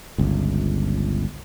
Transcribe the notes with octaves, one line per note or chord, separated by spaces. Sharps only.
G1 C#2